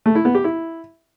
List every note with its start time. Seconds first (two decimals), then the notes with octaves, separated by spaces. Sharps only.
0.06 A3
0.15 E4
0.25 B3
0.35 G4
0.44 E4